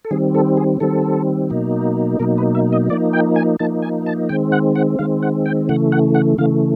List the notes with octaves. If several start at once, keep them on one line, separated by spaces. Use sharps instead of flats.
A4
D#3 G3 C4 G#4
A4
G#4
D#3 G3 C4 A4
B2 F#3 A#3 D#4
B2 F#3 A#3 D#4 A#4
B4
E5
D#5
F3 A#3 D#4 D5
G5
G#5
F3 A#3 D#4 A5
G#5
A5
D#3 G#3 C4 G5
F#5
F#5
D#3 G#3 C4 F5
F#5
G5
C#3 E3 A3 F#5
F#5
F#5
C#3 E3 A3 F5